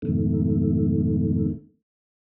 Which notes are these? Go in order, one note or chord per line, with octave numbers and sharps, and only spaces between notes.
F2 G#2 B2 D#3 A3